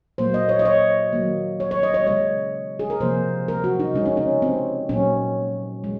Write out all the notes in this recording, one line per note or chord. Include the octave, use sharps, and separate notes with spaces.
A#2 F#3 A#3 C5
D#5
C#5
D#5
C#5
D#3 F#3 A#3
C#5
C#5
D#5
C#5
C#3 G#3 C#5
G#4
A#4
C3 F3 A#3 C5
A#4
F#4
D#4
C#3 G#3 C#4
D#4
C#4
C4
A#2 F#3 A#3 C#4
G#3